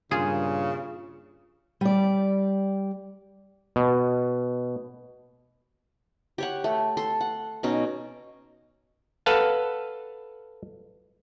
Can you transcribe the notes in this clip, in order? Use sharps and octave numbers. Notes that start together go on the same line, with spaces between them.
G2 A#2 C#3 F4 G#4
G3 D5
B2
G4 C#5 F#5
A3
A4 C6
F#5
B2 C#4 D#4
A4 B4 F5 F#5 A5